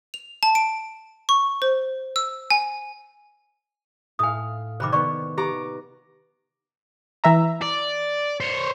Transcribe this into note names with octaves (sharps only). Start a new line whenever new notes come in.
F7
A5
D7
C#6
C5
E6
G#5
A2 F5 G#5 D#6
C3 D#3 C5 B5 D6
D#3 B3 D5 C#6
B3 G4 A#5 D6
E3 E5 A#5
D5
C5 C#5